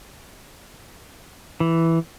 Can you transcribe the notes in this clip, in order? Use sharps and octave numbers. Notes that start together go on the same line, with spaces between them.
E3